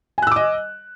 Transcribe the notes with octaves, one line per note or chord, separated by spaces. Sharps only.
D#5 G#5 D6 E6 F#6